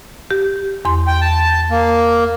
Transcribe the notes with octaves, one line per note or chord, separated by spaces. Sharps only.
G4
E2 C6
G5
A5
A#3